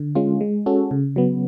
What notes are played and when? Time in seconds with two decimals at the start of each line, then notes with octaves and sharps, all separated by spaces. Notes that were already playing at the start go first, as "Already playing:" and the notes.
Already playing: D3
0.15 G#3 C#4 F4
0.41 G#3
0.66 C#4 F#4 A4
0.91 C#3
1.16 F#3 B3